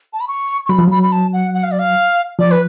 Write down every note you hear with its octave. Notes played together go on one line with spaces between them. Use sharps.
A5
B5
C#6
C#6
F#3 B5
F3
F#3 B5
B5
A5
F#5
F#5
F5
D5
F5
F3 D5
B4